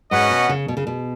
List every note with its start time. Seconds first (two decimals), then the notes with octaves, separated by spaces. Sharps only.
0.10 G#2 C#4 F#4 B4 D#5 F#5
0.30 B2
0.49 C#3
0.68 B2
0.77 C#3
0.87 B2